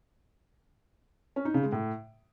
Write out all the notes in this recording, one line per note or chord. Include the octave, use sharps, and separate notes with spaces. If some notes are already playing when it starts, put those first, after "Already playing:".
C#4
D#4
C#3
G#3
A2